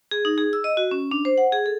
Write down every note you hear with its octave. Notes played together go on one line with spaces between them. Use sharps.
G#4
D#4
G#4
E6
D#5
F#4
C#4
D4
C5
F#5
G#4
A4